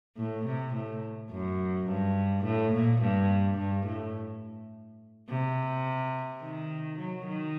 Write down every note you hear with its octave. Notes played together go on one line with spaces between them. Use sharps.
A2
C3
A2
F#2
G2
A2
A#2
G2
G2
A2
C3
D#3
F#3
D#3